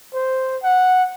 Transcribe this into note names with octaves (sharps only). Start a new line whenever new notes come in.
C5
F#5